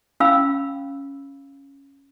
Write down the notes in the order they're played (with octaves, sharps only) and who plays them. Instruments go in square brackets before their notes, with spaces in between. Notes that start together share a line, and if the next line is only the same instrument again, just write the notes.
[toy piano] C#4 F5 G5 B5 E6